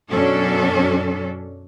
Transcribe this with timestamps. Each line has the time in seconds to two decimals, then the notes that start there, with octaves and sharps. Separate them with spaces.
0.10 F#2 B2 F#3 C#4 D4 A4